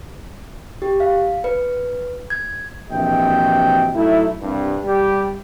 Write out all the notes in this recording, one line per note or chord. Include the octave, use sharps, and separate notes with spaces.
G4
F5
B4
G#6
A#1 C3 E3 F#4 D#5 G5
F#3 A3 D#4 E4
C2 G2
G3 G4